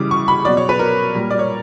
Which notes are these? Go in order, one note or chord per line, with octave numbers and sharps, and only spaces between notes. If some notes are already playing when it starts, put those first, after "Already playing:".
Already playing: C#3 E3 G3 D6
C#6
B5
B2 F#3 D5
C#5
B4
A#4
A#2 G3
D5
C#5